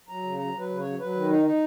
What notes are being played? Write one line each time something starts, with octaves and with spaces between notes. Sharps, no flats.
F#3 A#5
C#3
F#3 A#5
F#3 B4
C#3
C#5
F#3
F#3 B4
D#3
D#4
D#4